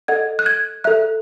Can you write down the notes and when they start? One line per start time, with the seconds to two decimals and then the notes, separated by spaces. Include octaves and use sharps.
0.08 A4 D#5 F#5 G#6
0.39 F#6
0.46 G#6
0.84 A4 E5 F#6